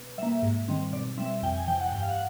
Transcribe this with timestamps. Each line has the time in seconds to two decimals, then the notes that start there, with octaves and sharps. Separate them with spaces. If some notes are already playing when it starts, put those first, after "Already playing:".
Already playing: B2
0.18 G3 A#3 E5
0.43 G#2
0.68 D#3 G3 C4
0.93 B2 D5
1.17 G3 C4 E5
1.42 F2 G5
1.55 G#5
1.67 C3 E3 G5
1.81 F#5
1.92 G2 G5
2.02 F5
2.10 F#5